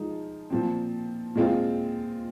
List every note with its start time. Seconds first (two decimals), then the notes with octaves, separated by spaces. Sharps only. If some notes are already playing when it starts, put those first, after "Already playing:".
Already playing: F3 G#3 D#4
0.50 A#2 F3 C4
1.35 A#2 G#3 C4 F4